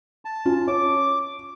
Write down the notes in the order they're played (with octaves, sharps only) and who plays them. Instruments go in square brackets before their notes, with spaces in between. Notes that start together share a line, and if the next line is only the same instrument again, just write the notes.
[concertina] A5
[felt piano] C#4 F4
[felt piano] C#5 [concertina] D6